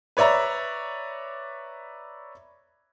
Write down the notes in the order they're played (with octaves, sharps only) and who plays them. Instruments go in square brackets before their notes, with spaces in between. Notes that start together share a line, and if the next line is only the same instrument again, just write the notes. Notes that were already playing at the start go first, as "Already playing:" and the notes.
[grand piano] B4 C#5 D5 E5 A#5